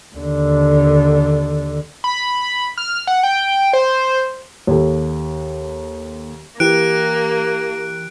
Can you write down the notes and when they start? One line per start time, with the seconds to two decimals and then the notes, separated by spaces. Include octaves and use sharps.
0.16 D#2 D3
2.04 B5
2.78 F6
3.07 F#5
3.24 G5
3.73 C5
4.67 D#2 A4
6.60 E3 A#3 G4 F#6 D7